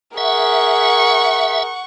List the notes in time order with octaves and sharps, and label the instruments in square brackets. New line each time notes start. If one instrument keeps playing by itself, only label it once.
[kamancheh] G#4 A#4 [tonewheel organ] E5 [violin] F#5 C#6